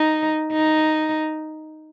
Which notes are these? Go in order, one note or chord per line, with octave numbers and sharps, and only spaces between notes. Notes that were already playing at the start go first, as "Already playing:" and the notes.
Already playing: D#4
D#4